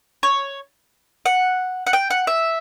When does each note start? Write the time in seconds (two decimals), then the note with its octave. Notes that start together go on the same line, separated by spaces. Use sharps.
0.23 C#5
1.26 F#5
1.86 F#5
1.93 G5
2.10 F#5
2.27 E5